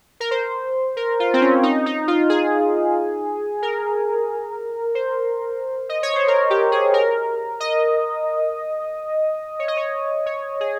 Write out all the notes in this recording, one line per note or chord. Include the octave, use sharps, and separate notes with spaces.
A#4
C5
A#4
F4
C4
C#4
D#4
D#4
F4
G#4
A#4
C5
D#5
C#5
C5
A#4
G4
G#4
A#4
D#5
C#5
D#5
C#5
C#5
G#4